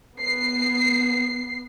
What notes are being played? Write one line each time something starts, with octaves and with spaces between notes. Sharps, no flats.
B3 C7